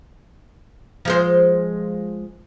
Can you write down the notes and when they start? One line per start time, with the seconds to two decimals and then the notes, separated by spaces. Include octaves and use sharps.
1.05 F3 G#3 C5